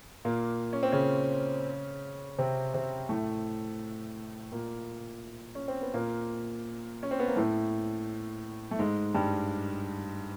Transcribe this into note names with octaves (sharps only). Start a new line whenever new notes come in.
A#2 A#3
C#4
C4
C#3 C#4
C3 C4
C3 C4
A2 A3
A#2 A#3
C#4
C4
B3
A#2 A#3
C#4
C4
B3
A#3
A2 A3
A3
G#2 G#3
G2 G3